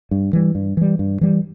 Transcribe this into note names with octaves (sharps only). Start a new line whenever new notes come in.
G2
E3 G3
G2
E3 G3
G2
E3 G3